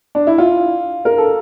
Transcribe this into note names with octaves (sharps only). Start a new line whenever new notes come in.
D4
E4
F4
A#4
A4